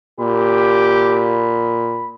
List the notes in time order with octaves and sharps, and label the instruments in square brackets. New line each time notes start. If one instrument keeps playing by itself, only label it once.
[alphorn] A#2 [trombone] G4 [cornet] B5